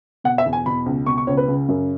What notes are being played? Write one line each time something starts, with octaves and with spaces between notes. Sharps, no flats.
B2 F#5
E5
E2
G#5
B2 B5
C#2
B2 C#6
C#6
C#2 C#5
B4
C#3
F#2